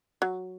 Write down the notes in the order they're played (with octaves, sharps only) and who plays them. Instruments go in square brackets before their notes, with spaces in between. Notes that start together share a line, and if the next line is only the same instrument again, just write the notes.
[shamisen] F#3